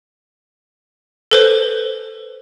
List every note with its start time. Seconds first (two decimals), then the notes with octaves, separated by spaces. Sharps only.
1.31 A4 B4 C5